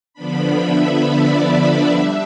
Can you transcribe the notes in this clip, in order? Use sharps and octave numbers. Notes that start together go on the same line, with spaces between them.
D3 F3 B3 D4 B5
E5
D5
G3 D4 E5